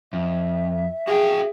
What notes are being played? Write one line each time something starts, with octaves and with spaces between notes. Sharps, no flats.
F2 E5
F#4 G#4 F5 G5